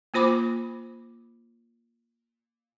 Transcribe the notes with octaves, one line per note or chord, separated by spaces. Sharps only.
A#3 F4 C5 B5 D6